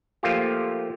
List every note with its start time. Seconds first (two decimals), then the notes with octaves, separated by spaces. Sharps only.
0.23 F3 A3 A#3 F4 G4